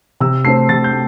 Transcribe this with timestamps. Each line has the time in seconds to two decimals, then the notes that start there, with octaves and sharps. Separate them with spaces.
0.20 C3 E6
0.44 A3 C4 C7
0.69 C3 A6
0.84 G6
0.92 A3